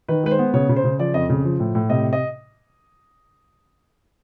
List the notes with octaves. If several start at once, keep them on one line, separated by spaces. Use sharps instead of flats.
D#3 B4
G#3 B4
C5
B3
C#3 C#5
C#3
C5
C#3
F3 D5
F2 D#5
C#3
F3
A2
A2
C3 D#5
D#5